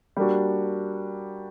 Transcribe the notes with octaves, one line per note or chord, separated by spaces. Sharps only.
G3 A#3 D4 F#4